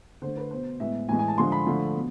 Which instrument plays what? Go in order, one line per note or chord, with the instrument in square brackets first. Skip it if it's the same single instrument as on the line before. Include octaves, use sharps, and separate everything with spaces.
[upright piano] D3 A3 C5
B4
B2 B3 C5
A2 G#3 B3 E5
A2 E3 G#3 G#5
G#5
A5
D3 F3 G#3 C6
B5
D3 F3 A3
B2